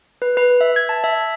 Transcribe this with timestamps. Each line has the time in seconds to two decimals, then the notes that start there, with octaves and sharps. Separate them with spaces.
0.22 B4
0.37 B4
0.61 E5
0.76 G#6
0.89 A5
1.04 E5